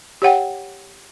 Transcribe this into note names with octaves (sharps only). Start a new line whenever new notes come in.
G4 C#5 F#5 G5